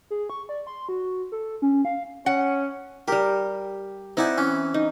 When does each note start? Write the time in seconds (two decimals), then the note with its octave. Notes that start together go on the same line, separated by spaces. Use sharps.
0.11 G#4
0.30 C#6
0.49 D5
0.67 C6
0.89 F#4
1.32 A4
1.62 C#4
1.85 F5
2.26 C#4 F#5
3.08 G3 G4 A#4
4.17 C4 D#4 E4 D5 F#5 G#5
4.38 E3 C#4
4.74 D#4